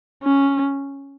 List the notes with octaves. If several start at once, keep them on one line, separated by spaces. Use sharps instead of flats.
C#4